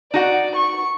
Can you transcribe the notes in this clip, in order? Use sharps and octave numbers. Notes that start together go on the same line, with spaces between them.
D#4 F#4 D5 F#5
C#6